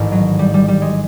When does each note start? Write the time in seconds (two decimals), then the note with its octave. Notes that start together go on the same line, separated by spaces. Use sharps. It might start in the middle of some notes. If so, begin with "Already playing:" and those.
Already playing: A1 G#2 D#3
0.12 F#3
0.39 G3
0.54 G3
0.68 G3
0.82 G#3